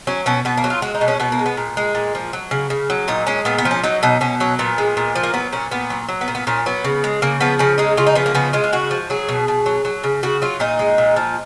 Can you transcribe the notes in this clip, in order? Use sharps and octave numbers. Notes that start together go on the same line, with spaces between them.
F#3 C#4
B2 C#4
B2 B3
A#3
F#3
F4
G#3 F#4
D#4
B2
C#4
B2 B3
A#3
G#3
B3
A#2
G#3
A#2
F3
F#3
C#3
C#3
F#3
A#2 D#4
G#3 C#4
A#2 B3
B3
F3
C#4
F#3 D#4
B2 D#4
B2 C#4
F#3 C#4
A#2 B3
G#3
A#2
F3
A#3
F#3 B3
A#2 C#4
A#2 B3
F#3
F#3
B3
A#2
B3
A#2 C#4
F#3 B3
C#3
G#3
C#3 A#3
F3 B3
C#3 C#4
G#3 D#4
C#3 F4
D#4
F3 B3
A#3
C#3 B3
G#3 F4
F4
C#3 F#4
F3
F#3 G#4
B2
B2
F#3
F#3
C#3
C#3 F#4
F#3 F4
A#2 D#4
G#3
A#2
F3